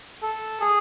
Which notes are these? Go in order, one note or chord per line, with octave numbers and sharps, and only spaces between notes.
A4
G#4